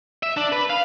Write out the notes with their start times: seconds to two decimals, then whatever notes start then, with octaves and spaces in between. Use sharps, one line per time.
0.23 E5
0.37 D4
0.52 B4
0.70 F5